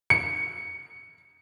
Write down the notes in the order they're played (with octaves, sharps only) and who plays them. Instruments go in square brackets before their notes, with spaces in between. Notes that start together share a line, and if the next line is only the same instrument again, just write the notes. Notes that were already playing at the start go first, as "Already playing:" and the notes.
[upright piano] C#7